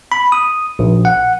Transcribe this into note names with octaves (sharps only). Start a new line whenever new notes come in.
B5
D#6
A#1
F#5